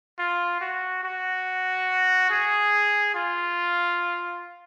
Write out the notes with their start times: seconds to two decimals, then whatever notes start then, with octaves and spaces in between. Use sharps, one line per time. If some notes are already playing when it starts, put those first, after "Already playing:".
0.19 F4
0.61 F#4
1.03 F#4
2.30 G#4
3.15 F4